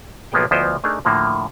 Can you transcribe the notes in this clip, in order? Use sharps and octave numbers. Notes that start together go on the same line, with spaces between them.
B1 F3 A#3 B3 G#4 G5
D2 F3 B3 E4 C5 D#5
A3 D4 D#4 G#4 A#4
A2 D3 F3 A#3